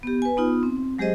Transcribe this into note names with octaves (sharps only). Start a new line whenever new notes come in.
B3 G4
B4 G#5
B3 D#4 F4
C4
F#3 G#3 G4 G#4 C5 D#5